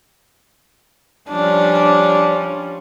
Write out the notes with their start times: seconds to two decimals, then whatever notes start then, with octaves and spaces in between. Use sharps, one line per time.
1.29 F3 G3 C#4 D4